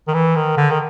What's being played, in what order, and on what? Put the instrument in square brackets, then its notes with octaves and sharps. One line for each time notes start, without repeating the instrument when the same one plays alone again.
[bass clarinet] D#3
E3
D#3
D3
D#3